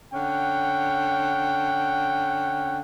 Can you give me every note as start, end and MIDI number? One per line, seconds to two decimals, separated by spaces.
0.14 2.81 50
0.14 2.81 61
0.14 2.81 78
0.14 2.81 79